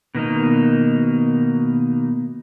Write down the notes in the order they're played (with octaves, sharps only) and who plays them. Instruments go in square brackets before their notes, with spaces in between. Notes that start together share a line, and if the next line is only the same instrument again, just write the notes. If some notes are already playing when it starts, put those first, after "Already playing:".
[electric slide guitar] B2 D#3 A#3 D#4